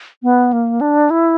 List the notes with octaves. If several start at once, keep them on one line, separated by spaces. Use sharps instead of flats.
B3
A#3
D4
E4